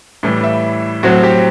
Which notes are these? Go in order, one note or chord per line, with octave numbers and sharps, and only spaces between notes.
A2 E3 G3
E5
A2 F#3 C4 F#4
G4